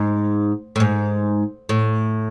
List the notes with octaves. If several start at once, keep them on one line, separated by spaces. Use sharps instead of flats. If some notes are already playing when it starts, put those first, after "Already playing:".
Already playing: G#2
A2
G#2
A2